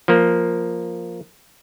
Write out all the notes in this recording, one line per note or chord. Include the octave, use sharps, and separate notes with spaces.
F3 A#3